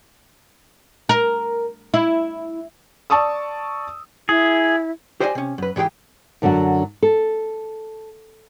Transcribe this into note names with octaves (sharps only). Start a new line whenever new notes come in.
A#4
E4
D5 A5 C#6 D#6 E6
E4 G#4
G4 C5 D5 D#5 F#5 G#5
C3 C#4
F#2 B4
G#2 E3 G4 G#4 G5
F#2 D3 F#3 D4 F#4
A4